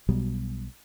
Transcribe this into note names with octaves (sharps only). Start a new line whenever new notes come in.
B1 B2 F#3 G3